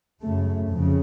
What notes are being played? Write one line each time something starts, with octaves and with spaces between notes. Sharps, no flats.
F#2 C#3 A3
F2 C#3